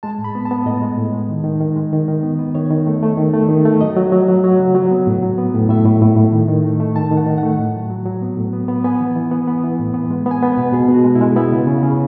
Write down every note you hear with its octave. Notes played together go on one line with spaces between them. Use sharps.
G#3 A5
A2
B5
B3
A5
B3
A2 D#5
G#3
A2
G#3
D#3
D#3
D#3
G#3
D#3
D#3
B3
B3
D#3 C#5
D#3
A3
A3
D#3
A3
D#3
A3
F#3 D#5
F#3
F#3
F#3
F#3
C#3
F#3
B3
A2
F#3
B3
A2
A2 E5
A2
A2
A2
D#3
D#3
A3
A3
D#3 A5
D#3
F#5
D#3
F#5
A3
A2
F#3
F#3
F#3
B3
A2
B3
B3
B3 G#5
E3
E3
B3
B3
E3
A2
B3
G#3
B3
G#5
B3
B4
B2
B2 G#4
B2
F#4
G#3
E4
G#3
B3 E4
C#3
C#3
C#3